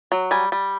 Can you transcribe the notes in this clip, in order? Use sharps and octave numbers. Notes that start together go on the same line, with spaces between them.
F#3
G3 G#5
G3